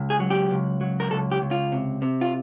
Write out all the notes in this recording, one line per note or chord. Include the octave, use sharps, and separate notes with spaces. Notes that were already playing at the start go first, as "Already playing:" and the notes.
Already playing: C#2
G#4
F#3
G4
C#2
F#3
A#4
C#2 A4
G4
C#2
F4
C3
C3
F4